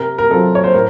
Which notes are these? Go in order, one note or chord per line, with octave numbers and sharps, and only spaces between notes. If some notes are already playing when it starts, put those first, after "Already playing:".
Already playing: C3 A#4
A#4
F#3 C4 F4 A4
C#5
C5
A2 A#4